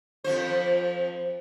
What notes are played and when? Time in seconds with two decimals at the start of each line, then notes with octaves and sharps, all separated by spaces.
0.24 F2 F3 C5